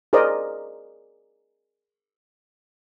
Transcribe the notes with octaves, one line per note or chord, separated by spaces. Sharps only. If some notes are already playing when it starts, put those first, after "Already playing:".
G#4 A#4 C5 D5 D#5